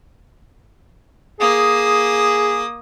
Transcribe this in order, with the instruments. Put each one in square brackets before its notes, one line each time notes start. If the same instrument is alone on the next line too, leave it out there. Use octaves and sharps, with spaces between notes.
[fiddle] A#3 D#6 [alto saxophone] G#4